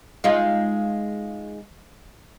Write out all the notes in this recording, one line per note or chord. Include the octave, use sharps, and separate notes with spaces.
G#3 D#4 F4